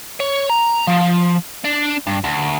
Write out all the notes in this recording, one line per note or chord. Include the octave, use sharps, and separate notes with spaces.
C#5
A#5
F3
D4
G2
D2